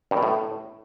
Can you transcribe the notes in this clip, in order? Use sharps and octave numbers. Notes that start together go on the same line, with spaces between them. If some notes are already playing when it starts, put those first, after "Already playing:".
G2
B2
A2